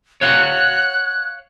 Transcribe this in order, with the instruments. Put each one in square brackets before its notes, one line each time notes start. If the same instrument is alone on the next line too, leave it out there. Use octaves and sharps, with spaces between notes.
[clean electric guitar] C#5 F5 F#5 [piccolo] F#6